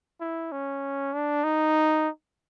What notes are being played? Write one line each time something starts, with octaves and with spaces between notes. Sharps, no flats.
E4
C#4
D4
D#4